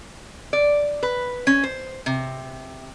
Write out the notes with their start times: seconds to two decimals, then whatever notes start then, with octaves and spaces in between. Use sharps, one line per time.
0.53 D5
1.03 B4
1.47 C#4
1.63 C5
2.06 C3